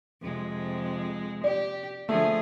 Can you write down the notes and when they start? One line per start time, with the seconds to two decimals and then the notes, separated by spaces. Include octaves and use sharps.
0.22 F2 C3 G#3
1.44 G4 D5
2.09 D3 F3 A3 G#4